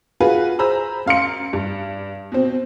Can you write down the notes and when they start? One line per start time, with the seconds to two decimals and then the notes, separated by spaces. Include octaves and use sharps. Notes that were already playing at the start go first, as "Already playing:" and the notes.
0.20 F4 F#4 G#4 B4
0.59 G#4 C5 A#5 B5 E6
1.06 F#2 F5 C6 C#7
1.53 G2
2.32 B2 C4